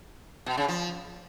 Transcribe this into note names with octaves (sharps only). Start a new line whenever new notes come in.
B2
C#3
F3